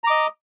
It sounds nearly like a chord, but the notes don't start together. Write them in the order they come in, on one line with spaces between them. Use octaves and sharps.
A#5 D6 D#5